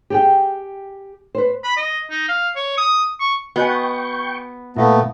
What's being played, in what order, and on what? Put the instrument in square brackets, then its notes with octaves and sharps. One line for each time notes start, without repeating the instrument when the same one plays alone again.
[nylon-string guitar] G4 G#4 G5
B4 C5
[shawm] B5
D#5
D#4
F5
C#5
D#6
C#6
[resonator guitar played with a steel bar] B3 [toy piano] F#4 D#5 G#5 [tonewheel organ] G5 C#6
[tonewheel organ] A#2 [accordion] A3 B3 [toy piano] E4 E5 F5